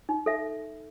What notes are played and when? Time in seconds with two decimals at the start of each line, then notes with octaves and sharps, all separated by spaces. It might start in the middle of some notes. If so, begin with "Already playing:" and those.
0.09 D#4
0.26 A4 E5